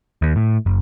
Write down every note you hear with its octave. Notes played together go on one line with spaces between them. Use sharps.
D#2
A2
F#1